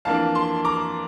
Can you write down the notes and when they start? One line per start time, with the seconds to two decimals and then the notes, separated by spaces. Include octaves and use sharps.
0.05 F2 E3 A#3 D4 F5 A5
0.35 A5 C6
0.65 A#5 D6